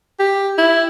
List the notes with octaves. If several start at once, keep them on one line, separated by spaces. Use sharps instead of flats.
G4
E4